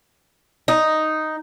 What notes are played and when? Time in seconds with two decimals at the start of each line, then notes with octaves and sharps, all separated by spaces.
0.68 D#4